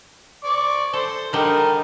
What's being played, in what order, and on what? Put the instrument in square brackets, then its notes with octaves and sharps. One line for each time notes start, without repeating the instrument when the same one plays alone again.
[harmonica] D5 C#6 D6
[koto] A4 [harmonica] C5
[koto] D3 G3 [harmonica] D#4 A#4